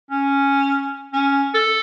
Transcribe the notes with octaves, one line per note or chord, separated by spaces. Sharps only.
C#4
C#4
A4